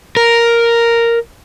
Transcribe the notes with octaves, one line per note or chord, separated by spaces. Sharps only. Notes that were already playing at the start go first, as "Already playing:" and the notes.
A#4